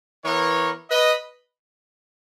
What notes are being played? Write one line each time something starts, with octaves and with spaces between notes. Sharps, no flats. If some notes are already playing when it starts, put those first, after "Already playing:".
E3 B3 A#4 C#5
B4 D#5